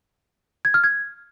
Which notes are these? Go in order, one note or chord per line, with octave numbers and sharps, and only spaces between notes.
G#6
F6
G#6